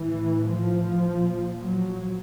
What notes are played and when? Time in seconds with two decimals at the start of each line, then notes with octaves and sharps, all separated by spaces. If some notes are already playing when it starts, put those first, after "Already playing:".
Already playing: A2 E3
0.49 F3
1.05 A#2
1.60 F#3